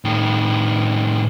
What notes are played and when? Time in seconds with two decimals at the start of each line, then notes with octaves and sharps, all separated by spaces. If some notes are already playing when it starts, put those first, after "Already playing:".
0.05 A2 D#3